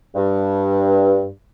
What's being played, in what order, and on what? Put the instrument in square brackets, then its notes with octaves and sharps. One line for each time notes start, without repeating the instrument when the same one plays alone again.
[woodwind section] G2